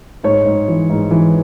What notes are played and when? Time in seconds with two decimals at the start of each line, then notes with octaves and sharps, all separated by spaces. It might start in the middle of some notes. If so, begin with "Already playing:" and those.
0.24 G#2 C#5
0.45 G#2
0.68 E3
0.89 G#2
1.11 E3